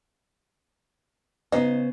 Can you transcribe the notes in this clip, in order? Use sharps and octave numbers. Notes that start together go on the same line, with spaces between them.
C#3 B3 D#4 C5